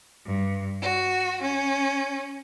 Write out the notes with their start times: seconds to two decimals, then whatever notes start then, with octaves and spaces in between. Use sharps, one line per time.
0.25 G2
0.81 F#4
1.41 C#4